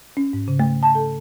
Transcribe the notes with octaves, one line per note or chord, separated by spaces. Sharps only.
C#4
G#2
C#3
A3
A5
A4